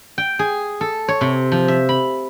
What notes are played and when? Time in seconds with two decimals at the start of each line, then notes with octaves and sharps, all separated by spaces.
0.18 G5
0.39 G#4
0.81 A4
1.08 C#5
1.21 C3
1.52 F3
1.68 E5
1.89 B5